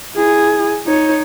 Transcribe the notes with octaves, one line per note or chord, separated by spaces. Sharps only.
E4 G#4
D#4 C#5